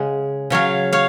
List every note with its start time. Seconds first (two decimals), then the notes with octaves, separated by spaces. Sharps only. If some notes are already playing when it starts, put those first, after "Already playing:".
Already playing: C#3 G#3 F#5
0.50 C#3 F#3 C#5 F5
0.92 C#5 F5